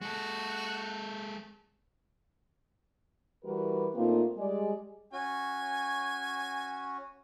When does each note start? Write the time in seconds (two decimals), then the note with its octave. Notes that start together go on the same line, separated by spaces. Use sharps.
0.01 G#3 F#4 A4
3.44 E3 G3 F#4 A#4 B4
3.95 A#2 A3 A#3 C4 D#4 F4
4.37 G3 G#3 D5
5.13 C#4 F#4 G#5